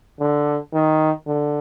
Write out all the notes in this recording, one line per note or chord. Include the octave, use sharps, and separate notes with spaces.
D3
D#3
D3